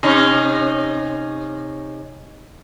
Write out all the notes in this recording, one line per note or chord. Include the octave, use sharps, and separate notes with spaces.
C3 C#4 D#4